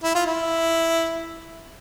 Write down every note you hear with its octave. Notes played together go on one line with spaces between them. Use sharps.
E4
F4
E4